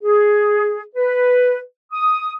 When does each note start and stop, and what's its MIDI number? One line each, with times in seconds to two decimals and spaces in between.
0.03 0.82 68
0.96 1.58 71
1.92 2.32 87